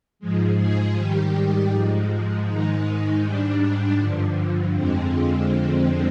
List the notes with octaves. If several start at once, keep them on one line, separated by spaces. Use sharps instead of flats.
G#2 F3 G#3
G#4
G#2 D#3 G3 G4
G#2 F3 G#3
G#2 D#3 G#3 D#4
G#2 G3 D4
G2 D3 F3
F2 D3 F3 G#3 C4